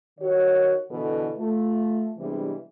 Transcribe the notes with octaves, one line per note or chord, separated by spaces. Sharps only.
D#3 F#4 C#5
B2 D3 E3 A4
A3 F4
C3 E3 G3 G#3 B3 D4